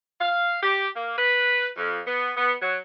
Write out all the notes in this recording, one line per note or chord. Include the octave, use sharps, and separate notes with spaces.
F5
G4
A#3
B4
F2
B3
B3
F#3